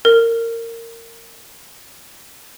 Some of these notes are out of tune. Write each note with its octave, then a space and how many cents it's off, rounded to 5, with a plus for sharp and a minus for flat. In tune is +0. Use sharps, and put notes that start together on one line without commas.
A#4 -20